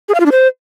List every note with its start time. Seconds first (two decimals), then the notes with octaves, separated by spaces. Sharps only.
0.09 G#4
0.14 F5
0.20 F4
0.26 D4
0.32 C5